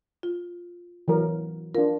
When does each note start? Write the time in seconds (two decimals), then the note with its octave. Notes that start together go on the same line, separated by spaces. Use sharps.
0.23 F4
1.08 E3 F#3 A#4
1.75 D4 F4 A#4